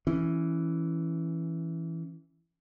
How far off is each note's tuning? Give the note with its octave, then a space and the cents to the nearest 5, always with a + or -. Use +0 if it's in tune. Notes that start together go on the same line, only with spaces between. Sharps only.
E3 +0 C#4 +0